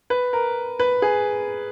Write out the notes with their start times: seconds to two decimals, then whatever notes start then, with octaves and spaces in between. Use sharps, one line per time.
0.10 B4
0.33 A#4
0.79 B4
1.02 G#4